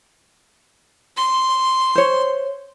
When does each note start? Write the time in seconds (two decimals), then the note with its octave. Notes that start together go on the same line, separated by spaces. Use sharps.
1.17 C6
1.95 C5 C#5